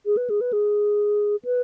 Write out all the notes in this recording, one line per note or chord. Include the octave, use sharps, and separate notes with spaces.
G#4
B4
G#4
B4
G#4
B4